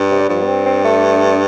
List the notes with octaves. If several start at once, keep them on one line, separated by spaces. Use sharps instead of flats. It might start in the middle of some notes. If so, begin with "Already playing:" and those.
Already playing: G2
C3
G3
G2 F3
B3
C4
C4
A3